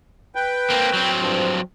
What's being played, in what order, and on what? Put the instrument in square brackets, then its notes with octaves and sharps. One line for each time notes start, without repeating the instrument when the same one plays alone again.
[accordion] B4 G5
[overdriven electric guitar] A#3 C4
F#3 C4
[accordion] G2 F3